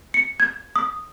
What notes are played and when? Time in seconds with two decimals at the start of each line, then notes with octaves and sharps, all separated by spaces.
0.14 C#7
0.40 G#6
0.76 D#6